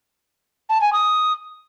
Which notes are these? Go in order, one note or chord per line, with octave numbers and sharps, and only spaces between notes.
A5
G#5
D#6